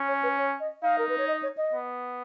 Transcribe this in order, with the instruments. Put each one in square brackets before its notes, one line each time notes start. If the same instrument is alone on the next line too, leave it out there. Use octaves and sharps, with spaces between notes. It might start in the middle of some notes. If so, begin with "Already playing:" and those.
Already playing: [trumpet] C#4
[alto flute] C#5
B4
C#5
D#5
[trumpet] D#4 [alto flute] F5
[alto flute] A#4
B4
C#5
D#5
C#5
D#5
[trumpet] B3